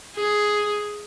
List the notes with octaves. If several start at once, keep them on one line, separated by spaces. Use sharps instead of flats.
G#4